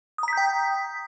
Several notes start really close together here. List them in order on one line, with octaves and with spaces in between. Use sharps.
D#6 A#5 B6 G6 G5